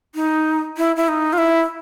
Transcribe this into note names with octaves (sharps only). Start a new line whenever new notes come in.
D#4
E4
E4
D#4
F4
E4